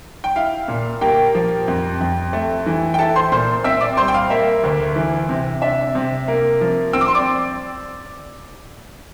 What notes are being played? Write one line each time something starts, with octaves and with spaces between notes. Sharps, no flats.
G5
E4 F5
A#2
A#3 G4 G5
F3
F2
F2
A3
E3
G5
E4 A4 A5
C5 C6
A#2 C5 C6
C4 E5 E6
D5 D6
G3 C5 C6
G5
F5
A#3 E5
D2
E3
C3
D4 E5
C3
A#3
F3
C4 E6
D6
C6
D5 D6